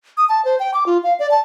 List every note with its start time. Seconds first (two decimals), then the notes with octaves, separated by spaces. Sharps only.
0.17 D#6
0.29 A5
0.45 C5
0.60 G5
0.74 D6
0.86 F4
1.04 F5
1.19 D5
1.31 A5